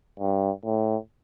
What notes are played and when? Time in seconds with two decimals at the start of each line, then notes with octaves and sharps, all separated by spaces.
0.20 G2
0.65 A2